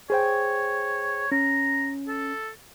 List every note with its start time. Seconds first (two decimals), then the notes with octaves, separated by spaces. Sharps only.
0.10 G#4 C5 C#5 G5
1.32 C#4 A#5
2.08 A4